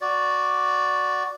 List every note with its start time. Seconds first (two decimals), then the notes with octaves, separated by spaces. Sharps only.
0.01 F#4 D5